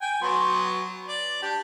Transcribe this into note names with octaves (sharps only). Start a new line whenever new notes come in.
G5 G#5
F#3 B3 C6
D5
D4 G4